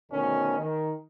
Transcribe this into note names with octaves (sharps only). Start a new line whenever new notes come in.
D2 B2 D#3 C#4
D#3